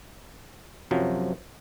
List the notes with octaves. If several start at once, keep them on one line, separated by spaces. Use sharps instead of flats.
F#2 C3 F3 F#3